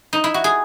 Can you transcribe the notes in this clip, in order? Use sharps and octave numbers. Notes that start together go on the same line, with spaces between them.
D#4
E4
F#4
G#4